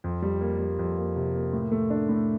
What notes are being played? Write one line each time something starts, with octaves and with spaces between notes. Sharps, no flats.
F2
G3
A#3
G3
F2
A#3
C3
A#3
A2
A3
D4
A2